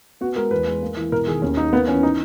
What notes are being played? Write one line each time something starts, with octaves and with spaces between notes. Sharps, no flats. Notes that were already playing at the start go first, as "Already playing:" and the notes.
B3 F#4
G#3 A#4
E2 B4
G#3
A#3
E3
E1 A#4
D#3 G#4
D#2 C#4
A#3 D#4
A#3 B3
E3 C#4
D#4